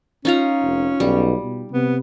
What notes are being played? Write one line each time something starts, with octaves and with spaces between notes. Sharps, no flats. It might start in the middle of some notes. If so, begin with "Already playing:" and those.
C#4 D#4 F4 A#5
F1
B1 G3
B2
C3 B3